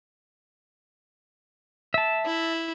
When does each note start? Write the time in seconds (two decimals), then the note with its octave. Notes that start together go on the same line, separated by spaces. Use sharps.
1.94 E5 A5
2.25 E4